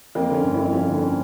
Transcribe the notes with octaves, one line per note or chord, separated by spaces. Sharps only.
F2 A#3
D3 C#4
G1
F2 E4
F3 C#4
D3
C#4